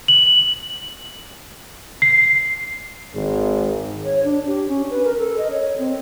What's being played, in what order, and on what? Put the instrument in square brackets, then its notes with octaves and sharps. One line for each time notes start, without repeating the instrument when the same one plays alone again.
[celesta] F#7
C7
[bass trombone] G#1 [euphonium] G#3
[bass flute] C#5
D4
G4
C#4
B4
A#4
A4
D#5
C#5
C4